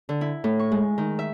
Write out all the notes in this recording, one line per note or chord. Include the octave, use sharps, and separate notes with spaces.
D3
E4
A2
C#6
G#3
D#3
E5